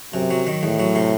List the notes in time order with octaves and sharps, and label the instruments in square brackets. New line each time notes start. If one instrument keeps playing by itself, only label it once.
[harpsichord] F#2 [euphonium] C3
[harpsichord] F#3
D#3
[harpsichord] E2 [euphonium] A2
[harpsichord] F#3
C3